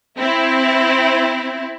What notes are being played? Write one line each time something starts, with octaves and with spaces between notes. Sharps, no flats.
C4 E4